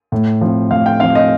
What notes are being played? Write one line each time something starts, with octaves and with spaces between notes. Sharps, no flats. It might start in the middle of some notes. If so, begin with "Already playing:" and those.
A2
F3 C4
A2 F5
G5
F3 C4 F5
D#5